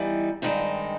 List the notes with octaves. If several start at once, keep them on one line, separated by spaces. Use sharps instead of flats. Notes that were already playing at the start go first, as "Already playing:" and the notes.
Already playing: E3 G3 B3 D#4
G2 D#3 G#3 C4 D#4